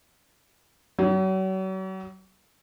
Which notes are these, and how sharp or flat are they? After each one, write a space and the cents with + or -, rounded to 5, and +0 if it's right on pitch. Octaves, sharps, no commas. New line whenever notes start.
F#3 +40